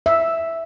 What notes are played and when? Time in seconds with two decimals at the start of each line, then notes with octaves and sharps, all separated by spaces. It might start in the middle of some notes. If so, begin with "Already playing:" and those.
0.06 E5